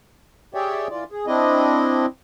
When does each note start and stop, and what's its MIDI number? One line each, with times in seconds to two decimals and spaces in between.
0.54 0.88 67
0.54 0.88 68
0.54 0.88 73
0.54 0.88 74
0.54 0.88 76
0.54 0.88 79
0.90 1.04 52
0.90 1.04 65
0.90 1.04 74
1.12 1.26 68
1.27 2.06 60
1.27 2.06 62
1.27 2.06 64
1.27 2.06 75